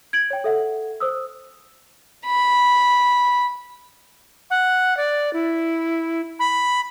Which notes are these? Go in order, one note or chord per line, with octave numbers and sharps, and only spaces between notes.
G#6 D7 F#7
C#5 G5
A4 E5 F#5
C5 D#6 E6
B5
F#5
D5
E4
B5